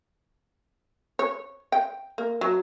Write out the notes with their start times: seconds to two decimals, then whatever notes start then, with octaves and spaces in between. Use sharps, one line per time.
1.19 C#5
1.72 G5
2.18 A#3
2.41 F#3